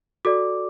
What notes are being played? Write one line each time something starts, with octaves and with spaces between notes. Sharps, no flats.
F#4 A4 D5 D6